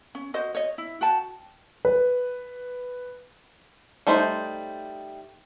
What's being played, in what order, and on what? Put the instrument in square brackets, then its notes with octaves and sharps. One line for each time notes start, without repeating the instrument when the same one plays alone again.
[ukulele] C#4
F#4 C5 D#5
C#5 D#5
E4
F#4 G5 A5
[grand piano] B4
[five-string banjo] G3 A3 D#4 C5 G5